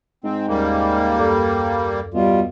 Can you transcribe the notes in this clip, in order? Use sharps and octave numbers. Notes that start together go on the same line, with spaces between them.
G#2 C4
D#2 G3 A#3 C#4
F#2 A4 D5
B2 G3 F4